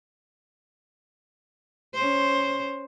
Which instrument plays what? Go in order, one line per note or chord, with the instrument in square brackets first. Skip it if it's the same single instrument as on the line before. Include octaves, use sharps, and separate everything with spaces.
[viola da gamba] C#4 C5